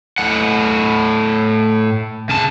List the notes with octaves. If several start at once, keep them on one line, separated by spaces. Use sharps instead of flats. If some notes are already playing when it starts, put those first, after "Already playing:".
A2 F#5
C#3 A5